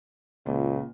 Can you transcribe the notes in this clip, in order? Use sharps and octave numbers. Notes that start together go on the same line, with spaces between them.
C#2 A#2